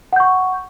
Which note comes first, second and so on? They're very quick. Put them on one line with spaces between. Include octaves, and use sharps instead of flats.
F#5 G6 C#6